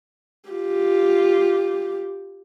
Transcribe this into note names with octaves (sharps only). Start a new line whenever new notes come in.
F4 G4